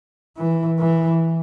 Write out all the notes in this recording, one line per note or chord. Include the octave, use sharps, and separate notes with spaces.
E3
E3